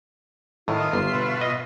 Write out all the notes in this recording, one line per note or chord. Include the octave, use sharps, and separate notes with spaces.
A2 D#3 F4 E5
G1 C6
B2
D#5